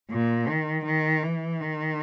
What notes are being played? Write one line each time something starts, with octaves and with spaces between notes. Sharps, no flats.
A#2
D#3
D#3
E3
D#3